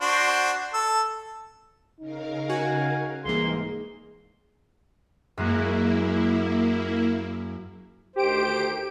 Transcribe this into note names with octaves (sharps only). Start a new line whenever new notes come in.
D4 F#4 C5
A4 E6
C#3 D#4 A#4 F5
F#4 G#5
C2 G#2 E3 A#3 D#4 G#4 C6
F#2 G#3 A#3 E4 F#4
D2 D#3 G4 C5 D7